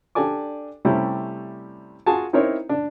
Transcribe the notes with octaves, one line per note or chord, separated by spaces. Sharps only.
D4 G4 A4 D5 G#5 D6
C3 G3 A3 C#4 E4 G4
F4 F#4 G#4 F5 G#5 A5
C4 D#4 E4 A#4 C5 C#5
D4